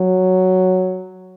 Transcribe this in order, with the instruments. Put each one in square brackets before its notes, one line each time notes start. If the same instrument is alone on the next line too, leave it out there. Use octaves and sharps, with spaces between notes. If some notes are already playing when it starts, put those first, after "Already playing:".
Already playing: [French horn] F#3